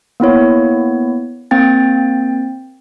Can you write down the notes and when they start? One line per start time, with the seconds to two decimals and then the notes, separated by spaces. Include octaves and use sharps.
0.20 A#3 B3 E4 C#5
1.51 A#3 C4 G5 A6